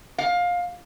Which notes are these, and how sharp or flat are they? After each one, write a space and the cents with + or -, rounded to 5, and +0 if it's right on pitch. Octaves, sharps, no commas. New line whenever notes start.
F5 +20